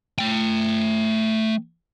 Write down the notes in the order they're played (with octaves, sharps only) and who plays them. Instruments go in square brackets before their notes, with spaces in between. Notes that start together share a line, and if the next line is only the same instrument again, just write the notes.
[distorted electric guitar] A3 G5